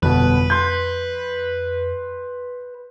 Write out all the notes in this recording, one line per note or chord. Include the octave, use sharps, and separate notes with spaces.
G1 F2 B2 B4
C6 G6